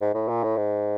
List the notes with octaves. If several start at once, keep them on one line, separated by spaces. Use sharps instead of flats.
G#2
A2
A#2
A2
G#2